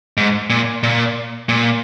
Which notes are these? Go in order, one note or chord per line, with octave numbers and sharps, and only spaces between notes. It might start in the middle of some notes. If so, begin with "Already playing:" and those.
G#2
A#2
A#2
A#2